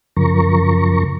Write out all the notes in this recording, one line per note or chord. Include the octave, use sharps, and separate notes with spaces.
F#2 C#3 F3 A#4 A#5 C#6